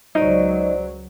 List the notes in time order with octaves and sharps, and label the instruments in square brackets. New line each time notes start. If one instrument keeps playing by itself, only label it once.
[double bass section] C#2 F#3 [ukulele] D#4 [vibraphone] C5 D5